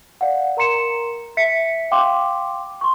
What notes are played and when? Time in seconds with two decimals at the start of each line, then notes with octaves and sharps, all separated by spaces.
0.21 D5 F5 F#5
0.57 A#4 A#5 C6 C#7 E7
1.37 E5 B6 C#7
1.91 F5 G5 C6 D6
2.81 C6 C#6